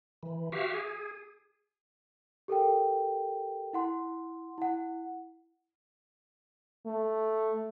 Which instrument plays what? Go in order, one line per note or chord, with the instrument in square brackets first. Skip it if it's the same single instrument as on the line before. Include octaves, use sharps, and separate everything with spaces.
[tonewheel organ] E3
F#4 G4 E5 F5
G#4
[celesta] G4 A4 A#4 G5
E4 F#5 C6
E4 F#5
[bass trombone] A3